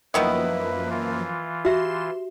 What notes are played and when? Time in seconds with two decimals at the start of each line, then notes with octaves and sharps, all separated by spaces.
0.14 F#2 D#3 F3 A#3 B3 E4 B4 D#6
0.90 E3 F4
1.65 F#4 G4 E5 C6 E7